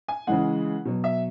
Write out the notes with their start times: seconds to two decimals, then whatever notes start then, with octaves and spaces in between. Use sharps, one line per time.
0.08 G#5
0.27 C#3 E3 G#3 F#5
0.85 B2 F#3
1.04 E5